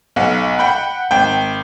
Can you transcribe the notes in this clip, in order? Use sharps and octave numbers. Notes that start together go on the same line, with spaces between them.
B1 F5 F#5
F#5 G5 B5
G#1 G5